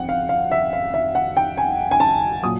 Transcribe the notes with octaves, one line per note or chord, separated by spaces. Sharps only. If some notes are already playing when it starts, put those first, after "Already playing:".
Already playing: F2 F#5 G5
F5
F5
E5
F5
E5
F#5
G5
G#5
G#5
A5
A#2 F#3 D#6